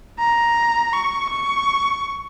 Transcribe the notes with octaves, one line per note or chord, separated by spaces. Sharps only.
A#5
C#6
C#6